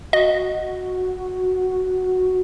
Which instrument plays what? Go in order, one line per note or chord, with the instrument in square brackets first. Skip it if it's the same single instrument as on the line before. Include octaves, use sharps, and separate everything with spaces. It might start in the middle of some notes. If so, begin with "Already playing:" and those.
[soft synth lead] F#4 [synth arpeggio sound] D#5